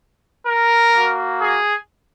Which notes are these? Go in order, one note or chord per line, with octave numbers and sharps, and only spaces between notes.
A#4
A#3 F#4
G#4